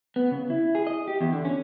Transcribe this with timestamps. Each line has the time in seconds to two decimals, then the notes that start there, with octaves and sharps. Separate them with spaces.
0.16 B3
0.31 C#3
0.50 E4
0.75 G#4
0.87 D#5
1.08 G4
1.21 E2
1.33 D3
1.45 C#4